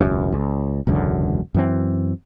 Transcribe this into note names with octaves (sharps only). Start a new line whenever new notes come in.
E1 C#2 F#2
C#2
E1 C#2 F#2 D3
F#2 E3 C4